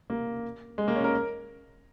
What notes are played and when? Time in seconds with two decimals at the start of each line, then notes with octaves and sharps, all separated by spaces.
0.10 A#3
0.78 G#3
0.88 A#3
0.96 C#4
1.04 A#4